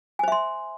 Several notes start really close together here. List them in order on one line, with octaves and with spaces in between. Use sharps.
G#5 C5 E5 C6